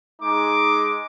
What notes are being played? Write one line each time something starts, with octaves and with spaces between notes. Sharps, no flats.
G#3 D#4 D6